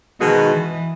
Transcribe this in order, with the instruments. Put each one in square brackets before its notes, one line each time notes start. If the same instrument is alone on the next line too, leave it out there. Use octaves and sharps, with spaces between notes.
[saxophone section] B2 G#3 D#4 F#4 B4 [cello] D#3
[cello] E3